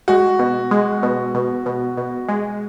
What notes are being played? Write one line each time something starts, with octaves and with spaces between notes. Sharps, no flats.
G#3 F#4
B2
G#3
B2
B2
B2
B2
G#3